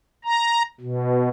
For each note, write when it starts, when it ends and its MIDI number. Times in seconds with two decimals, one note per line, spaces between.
0.25 0.62 82
0.81 1.29 47